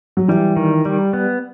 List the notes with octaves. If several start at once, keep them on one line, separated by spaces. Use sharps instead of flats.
F#3
E3 G3
D#3
G3
B3